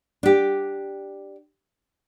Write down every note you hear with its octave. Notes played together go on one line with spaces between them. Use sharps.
D4 G4